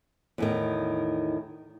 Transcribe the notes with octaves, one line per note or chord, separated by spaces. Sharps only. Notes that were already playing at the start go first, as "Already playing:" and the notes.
E2 A2 D#3